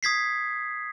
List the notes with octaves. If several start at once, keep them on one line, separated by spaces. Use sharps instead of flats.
D#6 G#6 B6 C7